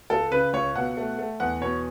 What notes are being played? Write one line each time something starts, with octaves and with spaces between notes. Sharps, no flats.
C#2 A4
C#3 B4
C#2 C#5
B2 F#5
A3
A3
E2 F#5
B2 C#5